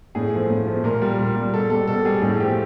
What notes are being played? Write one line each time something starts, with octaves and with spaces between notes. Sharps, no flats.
A2 G#4
F3 A3
A2
F3 A3
A#2 A#4
G3
A#2
G3
B2 A4
G3 A4
B2 A4
G3 G#4
A2 G#4
F3 A3 G4